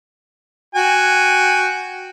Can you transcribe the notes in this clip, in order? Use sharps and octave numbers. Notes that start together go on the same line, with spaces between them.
F#4 G5 G#5